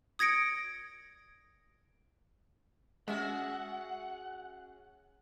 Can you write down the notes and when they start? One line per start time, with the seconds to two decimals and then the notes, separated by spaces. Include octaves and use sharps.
0.19 D#6 G#6 A#6 C#7 D7
3.08 G#3 C#4 F#4 G#4 E5 F#5 E6